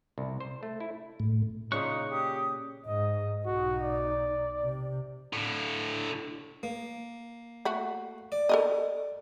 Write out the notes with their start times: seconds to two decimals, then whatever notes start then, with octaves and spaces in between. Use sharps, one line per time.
0.18 C2
0.40 C5
0.63 A3
0.80 E4
1.20 A2
1.72 A#2 C#3 D#4 C#6 F#6
2.11 G4 D#6
2.86 G#2 D#5
3.46 B1 D#4 F#4
3.82 D5
4.63 C3
5.33 A2 D3
6.63 A#3
7.65 A3 F#4
8.32 D5
8.49 A4 A#4 D#5